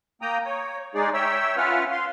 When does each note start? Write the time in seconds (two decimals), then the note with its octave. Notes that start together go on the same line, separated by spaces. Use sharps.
0.22 A#3 G5 A#5 D#6
0.45 C#5
0.95 G#3 D#4 G#4 D5
1.14 C#5 E5 G5 E6
1.57 C#4 F4 B4 E5 F#5 F6
1.91 F5 C6